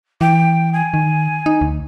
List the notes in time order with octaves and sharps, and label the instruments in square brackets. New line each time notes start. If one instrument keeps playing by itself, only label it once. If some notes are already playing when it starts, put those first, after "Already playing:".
[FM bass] E3 [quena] G5
[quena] G#5
[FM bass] D#3
D#4
D2